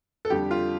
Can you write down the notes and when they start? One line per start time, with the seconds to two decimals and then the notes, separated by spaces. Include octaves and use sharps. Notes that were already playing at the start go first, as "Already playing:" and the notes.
0.25 A4
0.30 F2 D3 G3 G4
0.51 F4